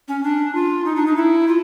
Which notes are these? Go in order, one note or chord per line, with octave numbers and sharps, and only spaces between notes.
C#4
D4
F4
D#4
D4
D#4
E4
F4